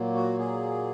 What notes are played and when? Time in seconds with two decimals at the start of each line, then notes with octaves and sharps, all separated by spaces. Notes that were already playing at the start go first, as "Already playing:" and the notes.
Already playing: A#2 F#3 A#3
0.15 F#4
0.39 G#4